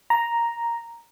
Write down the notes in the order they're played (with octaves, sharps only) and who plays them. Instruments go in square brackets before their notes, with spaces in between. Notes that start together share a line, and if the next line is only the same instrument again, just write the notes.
[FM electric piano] A#5